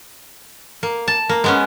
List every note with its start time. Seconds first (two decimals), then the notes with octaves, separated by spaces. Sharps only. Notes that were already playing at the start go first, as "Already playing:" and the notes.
0.83 A#3
1.08 A5
1.29 A#3
1.44 G#3 B3 C#4